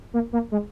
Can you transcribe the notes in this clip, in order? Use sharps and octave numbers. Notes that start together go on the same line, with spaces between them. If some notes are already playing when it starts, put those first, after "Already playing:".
A#3
A#3
G#3